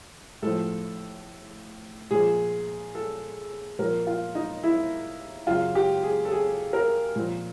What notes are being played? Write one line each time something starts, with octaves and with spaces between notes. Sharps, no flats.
A2 F3 A4
A#2 F3 G#4
A4
A#2 F3 A#4
F4
D#4
E4
F#2 C#3 F#3 F4
G4
G#4
A4
G#4
A#4
A#2 F3